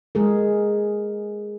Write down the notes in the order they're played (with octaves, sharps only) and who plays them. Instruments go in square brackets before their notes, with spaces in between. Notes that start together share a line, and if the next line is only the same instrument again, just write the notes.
[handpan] G#3 G#4 A#4